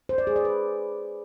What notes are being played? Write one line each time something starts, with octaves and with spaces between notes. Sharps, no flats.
C5
D5
G#4
D5
B4